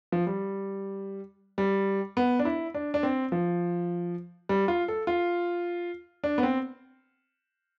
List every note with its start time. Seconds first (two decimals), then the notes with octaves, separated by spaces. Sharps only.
0.12 F3
0.27 G3
1.58 G3
2.17 B3
2.39 D4
2.45 E4
2.74 D4
2.94 D4
3.03 C4
3.32 F3
4.49 G3
4.68 F4
4.88 A4
5.07 F4
6.24 D4
6.38 B3
6.43 C4